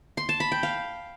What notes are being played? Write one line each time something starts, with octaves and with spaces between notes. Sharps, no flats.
C6
A5
B5
G5
F5